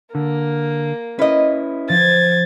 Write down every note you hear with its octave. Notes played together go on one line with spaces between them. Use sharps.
D3 A#3
C#4 E4 B4 D#5
F3 G#6 A6